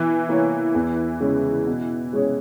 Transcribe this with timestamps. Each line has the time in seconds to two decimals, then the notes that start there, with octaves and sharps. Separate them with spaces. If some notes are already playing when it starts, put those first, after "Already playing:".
Already playing: B2 E3
0.29 A#3 E4 A#4 C#5
0.74 E2
1.21 C#3 G#3 C#4
1.67 B2
2.13 G#3 C#4 G#4 C#5